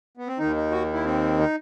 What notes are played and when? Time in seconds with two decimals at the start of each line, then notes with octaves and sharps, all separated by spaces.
0.17 B3
0.28 C4
0.39 D#2 D#3 D#4
0.56 D#4
0.71 F#4
0.93 E4
1.05 C4
1.39 D#4